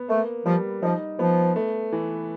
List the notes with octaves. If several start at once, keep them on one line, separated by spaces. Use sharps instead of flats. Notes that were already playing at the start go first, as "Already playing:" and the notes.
Already playing: B3
A3 A#3
F3 G3
F3 D#4
F3 B3
A3
E3